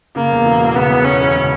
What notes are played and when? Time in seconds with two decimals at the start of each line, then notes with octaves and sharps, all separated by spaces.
0.16 C#3 A#3
0.32 E2
0.46 E1
0.61 E1
0.75 C#3 B3
0.90 E2
1.05 E1 C#4
1.20 E1
1.35 C#3